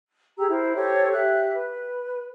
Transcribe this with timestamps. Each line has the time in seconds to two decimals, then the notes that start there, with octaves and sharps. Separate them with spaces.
0.38 G4 G#4 A#5 E6
0.50 E4 A#4 C5
0.75 G4 A4 C5 C#5
1.13 G4 E5 F#6
1.53 B4